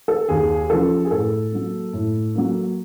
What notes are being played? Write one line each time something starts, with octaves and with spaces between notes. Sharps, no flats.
A4
D#2 G#4
C#3 F3 A4
G#4
A2 A4
F#3 A#3
A2
F#3 A#3